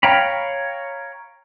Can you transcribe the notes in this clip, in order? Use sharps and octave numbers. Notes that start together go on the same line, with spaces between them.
C#5 F5 G5 A#5 B5